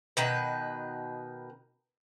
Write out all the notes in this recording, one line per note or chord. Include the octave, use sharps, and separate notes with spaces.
B2 D#3 B4